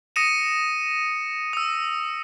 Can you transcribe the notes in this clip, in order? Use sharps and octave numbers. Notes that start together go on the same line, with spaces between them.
D#6 A#6 C#7 D#7 E7
D#6 E6